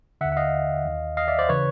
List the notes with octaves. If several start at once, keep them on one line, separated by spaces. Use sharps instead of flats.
D#2 D3 E5 F#5
F#5
D#5 F5
D#2 D#3
D#5 F5
D5 E5
C5 D5
C#3 E3 B4 C#5